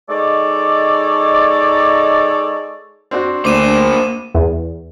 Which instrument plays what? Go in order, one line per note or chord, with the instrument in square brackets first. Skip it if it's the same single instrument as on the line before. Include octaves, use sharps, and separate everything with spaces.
[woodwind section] G#3 D#4 A4 C#5 D5
[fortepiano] C4 D4 F#4
[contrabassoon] D2 [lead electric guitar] A#3 C5 [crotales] D6 D#7 E7
[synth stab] E2